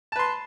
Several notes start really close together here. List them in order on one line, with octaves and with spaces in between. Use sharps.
A5 B4 C6